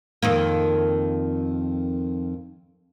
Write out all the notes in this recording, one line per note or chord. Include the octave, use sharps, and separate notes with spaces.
F2 D#3 A#3